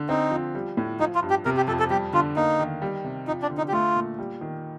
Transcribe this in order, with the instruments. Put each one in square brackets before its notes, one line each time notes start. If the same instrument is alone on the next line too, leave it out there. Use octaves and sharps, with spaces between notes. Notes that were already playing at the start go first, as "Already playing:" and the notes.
Already playing: [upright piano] D3
[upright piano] C4 [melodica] D#4
[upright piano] F3
G3
A2
[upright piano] F3 [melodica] D#4
[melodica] F4
[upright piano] G2
[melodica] G4
[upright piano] C3 [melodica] A#4
[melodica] G4
[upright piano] F2 [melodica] A4
[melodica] A4
[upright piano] G3 [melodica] G4
[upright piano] D3 [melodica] F4
[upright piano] A#3 [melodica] D#4
[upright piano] D#3
G3
C3
[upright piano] F3 [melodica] D#4
[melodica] D4
[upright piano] D3
[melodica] D#4
G4
[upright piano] A3 [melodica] F4
[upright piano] A#2
G3
D#3